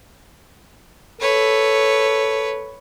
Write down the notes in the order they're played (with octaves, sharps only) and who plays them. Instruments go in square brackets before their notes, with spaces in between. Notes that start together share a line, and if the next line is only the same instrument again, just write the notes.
[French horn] A4 [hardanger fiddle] B4 C#5